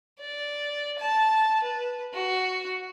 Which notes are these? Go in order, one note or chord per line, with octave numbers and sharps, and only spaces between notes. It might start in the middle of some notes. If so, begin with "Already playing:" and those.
D5
A5
B4
F#4